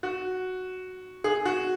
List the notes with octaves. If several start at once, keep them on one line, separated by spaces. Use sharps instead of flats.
F#4
G#4
F#4